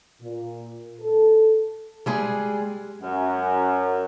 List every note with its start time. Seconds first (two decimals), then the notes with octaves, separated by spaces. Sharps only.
0.22 A#2
1.01 A4
2.06 G3 G#3 G#4
3.02 F#2